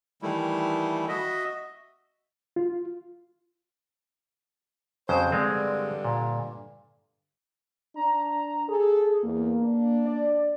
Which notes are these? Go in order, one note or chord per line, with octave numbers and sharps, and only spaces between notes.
D#3 E3 G3 A3 E4
F#4 D#5 E5
F4
F2 C#3 F#3 C5
G2 D3 G#3 C4
A#2
D4 A#5
G#4 A4
E2 A#3
D4
D5